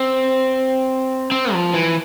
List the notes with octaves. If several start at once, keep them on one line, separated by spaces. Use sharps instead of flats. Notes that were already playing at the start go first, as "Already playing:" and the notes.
Already playing: C4
C4
F3
E3